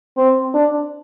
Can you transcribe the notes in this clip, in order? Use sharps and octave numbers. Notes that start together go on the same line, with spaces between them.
C4
D4